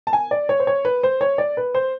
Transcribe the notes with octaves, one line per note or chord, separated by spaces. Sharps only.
A5
G#5
D5
C#5
C5
C#5
B4
C5
C#5
D5
B4
C5